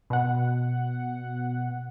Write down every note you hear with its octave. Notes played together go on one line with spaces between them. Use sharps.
B2 F#5